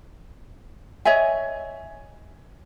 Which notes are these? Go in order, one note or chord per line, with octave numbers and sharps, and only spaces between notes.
C#5 D#5 E5 G#5